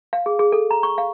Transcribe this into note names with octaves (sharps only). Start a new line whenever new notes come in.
F5
G#4
G#4
A4
A#5
C#6
F5